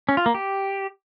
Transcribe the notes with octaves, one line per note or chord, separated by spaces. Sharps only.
C#4
F4
A#3
G4